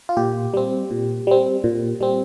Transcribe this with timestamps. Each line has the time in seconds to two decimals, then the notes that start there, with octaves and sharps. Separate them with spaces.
0.09 F4
0.17 A#2 G4
0.54 G3 C4
0.91 A#2
1.27 G3 C4
1.64 A#2
2.01 G3 C4